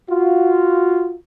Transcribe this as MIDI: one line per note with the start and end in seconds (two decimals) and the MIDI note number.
0.11 1.15 65
0.11 1.15 66